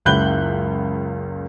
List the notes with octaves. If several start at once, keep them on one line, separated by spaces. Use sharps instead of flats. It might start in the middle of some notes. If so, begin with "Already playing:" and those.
F#1 C#2 B5 F#6 G6 G7